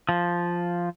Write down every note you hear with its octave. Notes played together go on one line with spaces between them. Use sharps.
F3